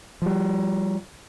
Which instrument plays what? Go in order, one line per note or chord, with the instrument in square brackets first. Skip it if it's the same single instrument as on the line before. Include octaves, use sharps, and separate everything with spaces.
[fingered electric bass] F3 G3